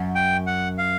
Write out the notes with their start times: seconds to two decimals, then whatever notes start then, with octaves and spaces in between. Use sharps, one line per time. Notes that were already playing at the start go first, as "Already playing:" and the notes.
Already playing: F#2
0.15 G5
0.47 F#5
0.78 F5